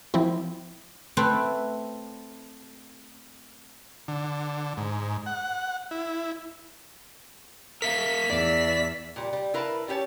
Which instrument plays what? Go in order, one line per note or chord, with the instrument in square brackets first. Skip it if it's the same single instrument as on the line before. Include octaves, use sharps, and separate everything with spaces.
[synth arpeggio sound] F3 C4 E4
[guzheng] A3 C4 E4 B4 C5
[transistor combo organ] D3
G#2
F#5
E4
[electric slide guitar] A#4 E5 F5 [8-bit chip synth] B6
[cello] E2 E5 [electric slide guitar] D5
[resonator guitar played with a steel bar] A#2 G3
G3
E4 A#4 B4 F5 F#5 A5
G3 C#4 G4 C#5 A5